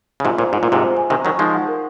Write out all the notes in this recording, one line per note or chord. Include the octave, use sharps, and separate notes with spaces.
C#3
G#2 C3 F4
A#2 C5
G#2 F4
A#2
G#2 C3 F4
C5
G#5
C3 D#3 G#5
D#3 F#3 C#6
F3 G#3 D#4
F#5
A#4